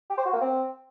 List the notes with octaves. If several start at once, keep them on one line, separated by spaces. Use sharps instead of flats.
G4
C5
F#4
A#3
C4